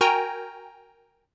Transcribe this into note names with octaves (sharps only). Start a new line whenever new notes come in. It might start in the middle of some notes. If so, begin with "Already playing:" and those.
F#4 A#4 G5 G#5 A#5